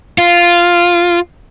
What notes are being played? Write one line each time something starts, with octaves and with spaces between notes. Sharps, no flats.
F4